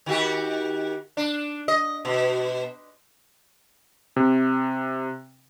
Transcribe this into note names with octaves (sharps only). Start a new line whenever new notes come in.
D#3 F#4 G4
D4
D#5
B2
C3